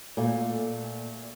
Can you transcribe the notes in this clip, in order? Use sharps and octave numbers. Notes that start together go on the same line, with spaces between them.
A#2 A3